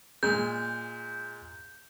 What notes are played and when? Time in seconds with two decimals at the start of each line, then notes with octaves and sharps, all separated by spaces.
0.23 A#2 G#3 G6